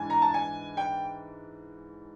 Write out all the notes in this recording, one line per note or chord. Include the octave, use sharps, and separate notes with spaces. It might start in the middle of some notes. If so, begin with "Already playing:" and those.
Already playing: G#2 E3 D4 G#5
A#5
A5
G#5
G5